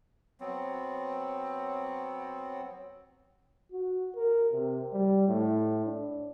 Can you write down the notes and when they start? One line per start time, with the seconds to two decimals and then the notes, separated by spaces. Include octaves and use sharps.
0.40 F#3 B3 C4
3.72 F#4
4.16 A#4
4.52 C3
4.93 G3
5.28 A2
5.86 D4